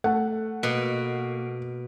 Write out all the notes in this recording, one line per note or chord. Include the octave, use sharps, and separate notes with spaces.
A3 F#5
B2 A#3